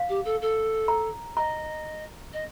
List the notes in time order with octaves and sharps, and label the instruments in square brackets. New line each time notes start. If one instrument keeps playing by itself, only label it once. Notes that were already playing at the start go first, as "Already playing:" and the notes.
Already playing: [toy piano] F5
[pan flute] G4
A4
A4
[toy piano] A#5
[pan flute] D#5 [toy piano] A#5
[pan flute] D#5